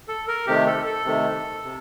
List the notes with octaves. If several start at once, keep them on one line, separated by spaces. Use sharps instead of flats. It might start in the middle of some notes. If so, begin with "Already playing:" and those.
A4
A#4
C3 D#3 A3 G4
A4
A4
C3 D#3 A3
C3